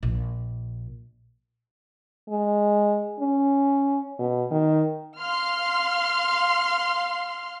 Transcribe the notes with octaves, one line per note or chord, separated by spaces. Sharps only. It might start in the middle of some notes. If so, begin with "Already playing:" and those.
A#1
G#3
C#4
B2
D#3
F5 C6 F6